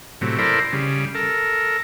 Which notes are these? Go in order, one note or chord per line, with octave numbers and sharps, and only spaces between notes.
A2 C3 F#3
E4 A4 A#4 C5 D5
C#3 G3
A4 A#4